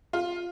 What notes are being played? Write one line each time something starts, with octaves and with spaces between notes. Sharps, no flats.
F4